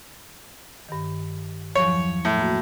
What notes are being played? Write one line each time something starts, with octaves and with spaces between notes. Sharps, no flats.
G2 D#3
E2 F3 F#3 C#5
A2
A#3 F#4